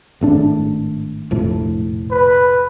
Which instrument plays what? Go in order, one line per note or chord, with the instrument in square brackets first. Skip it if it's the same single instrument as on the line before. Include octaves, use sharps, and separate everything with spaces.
[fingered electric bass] G#1 A2 D4
F1 A#1 A2
[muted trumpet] B4